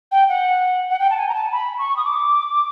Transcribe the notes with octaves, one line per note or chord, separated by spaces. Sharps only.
G5
F#5
F#5
G5
A5
G#5
A#5
A5
B5
C#6
D#6
D6